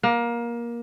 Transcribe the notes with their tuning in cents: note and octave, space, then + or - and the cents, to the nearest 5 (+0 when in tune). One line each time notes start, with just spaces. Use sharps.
A#3 +20